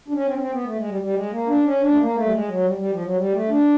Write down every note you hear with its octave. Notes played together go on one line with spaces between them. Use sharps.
D4
C#4
C4
C#4
C4
B3
A3
G#3
G3
G3
G#3
A#3
D4
C#4
D4
A3
A#3
A3
G3
G#3
F#3
G3
G3
F3
F#3
G3
A3
D4